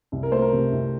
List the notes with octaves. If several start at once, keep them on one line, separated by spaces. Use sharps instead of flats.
C2
A#4
A3 C5
A#4
C3
C2